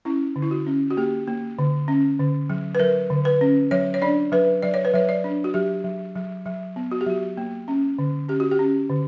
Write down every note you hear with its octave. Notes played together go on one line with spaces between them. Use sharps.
C#4 E4
D3
E4
F#4
C#4
F#4
A#3 G4
A#3
D3
C#4
D3
F#3
B4
F#3 A#4
D3
B4
C#4
F#3 C#5
C#5
D4 D5
F#3 B4
F#3 D5
C#5
B4
F#3 C#5
D5
D4
F#4
F#3 G4
F#3
F#3
F#3
B3
F#4
G4
F#3 F#4
A#3
C#4
D3
C#4 G4
F#4
G4
C#4
D3